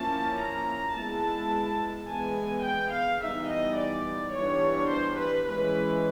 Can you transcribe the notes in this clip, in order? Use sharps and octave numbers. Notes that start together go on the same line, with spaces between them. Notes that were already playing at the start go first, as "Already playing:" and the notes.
Already playing: F3 A#3 C#4 E4 A5
A#5
G#3 B3 E4 A5
E3 G#3 B3 G#5
G5
F5
E3 G3 B3 D#4 E5
D#5
D5
E3 G3 B3 D4 C#5
C5
B4
E3 G#3 C#4 B4